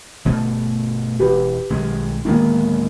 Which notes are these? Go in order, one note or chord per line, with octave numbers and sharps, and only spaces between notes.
G1 B2 A3
E1 G4 B4
B1 D#3 G#3
D1 D#3 G#3 A#3 B3